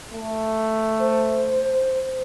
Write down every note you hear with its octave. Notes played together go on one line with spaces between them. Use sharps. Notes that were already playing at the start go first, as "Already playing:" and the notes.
A3
C5